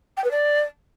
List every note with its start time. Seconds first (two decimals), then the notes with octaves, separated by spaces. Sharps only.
0.17 G5
0.24 B4
0.31 D5